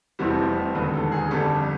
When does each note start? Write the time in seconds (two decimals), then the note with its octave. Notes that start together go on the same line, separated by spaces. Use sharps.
0.19 F1 F2 C3 E3 G3 F#4
0.75 E1 D#2 D3 B4
0.94 A4
1.12 G#4
1.31 G1 F2 D3 G3 A4